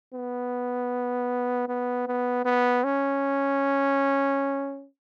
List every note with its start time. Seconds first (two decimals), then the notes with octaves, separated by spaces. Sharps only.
0.14 B3
1.69 B3
2.08 B3
2.45 B3
2.84 C#4